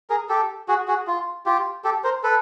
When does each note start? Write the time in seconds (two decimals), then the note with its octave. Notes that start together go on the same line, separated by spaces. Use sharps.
0.10 G#4 A#4
0.29 G4 A4
0.68 F#4 G#4
0.88 F#4 G#4
1.07 F4
1.46 F4 G4
1.84 G4 A4
2.04 A#4 C5
2.23 A4 B4